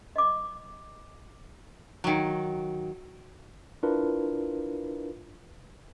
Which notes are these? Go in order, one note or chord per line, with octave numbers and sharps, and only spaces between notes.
D#5 D6
D#3 F#3
D4 E4 F4 A#4 B4